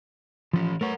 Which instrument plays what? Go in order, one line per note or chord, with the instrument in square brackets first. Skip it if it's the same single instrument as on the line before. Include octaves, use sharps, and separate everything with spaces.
[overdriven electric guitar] E3 C#4 [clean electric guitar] F3
[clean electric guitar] A3 B4 C#5 [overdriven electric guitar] A#4 F#5